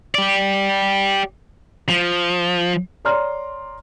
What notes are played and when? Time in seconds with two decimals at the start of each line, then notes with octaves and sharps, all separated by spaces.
0.15 G4 D5
1.89 F3
3.05 C#5 D5 A#5 C6 F6